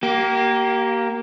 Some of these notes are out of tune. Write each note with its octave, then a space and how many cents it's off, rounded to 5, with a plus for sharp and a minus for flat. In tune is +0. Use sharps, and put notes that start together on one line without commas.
A#3 +0 G4 -30